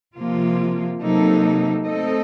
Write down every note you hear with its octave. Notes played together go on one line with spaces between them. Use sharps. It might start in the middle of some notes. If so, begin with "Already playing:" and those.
C3 F3 A#3 F4
C3 F#3 A#3 D#4 A4
A3 C4 D#4 A4 D#5